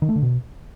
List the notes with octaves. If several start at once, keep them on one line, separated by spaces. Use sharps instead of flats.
D#3
A3
D3
B2